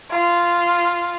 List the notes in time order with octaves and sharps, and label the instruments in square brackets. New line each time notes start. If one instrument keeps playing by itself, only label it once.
[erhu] F4